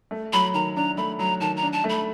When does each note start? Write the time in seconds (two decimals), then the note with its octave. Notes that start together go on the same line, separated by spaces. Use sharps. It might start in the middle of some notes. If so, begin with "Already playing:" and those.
0.11 A3
0.33 F#3 B5
0.54 D#3 A#5
0.76 D4 A#5
0.97 A3 B5
1.19 F#3 A#5
1.41 D#3 A5
1.57 A#5
1.62 D4
1.73 A5
1.84 A3
1.89 B5